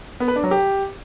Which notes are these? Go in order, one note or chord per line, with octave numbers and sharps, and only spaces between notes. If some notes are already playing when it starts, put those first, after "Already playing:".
B3
B4
D4
F#3
G4